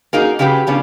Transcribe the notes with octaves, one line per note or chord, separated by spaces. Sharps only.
A#3 C#4 D#4 F#4 G#4 A#4
C#3 F#3 G4 G#4 B4
C#3 F3 B3 C#4 D4